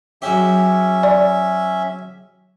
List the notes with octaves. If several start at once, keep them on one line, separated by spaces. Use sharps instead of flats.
F#3 G#3 C#4 G4 E5
D5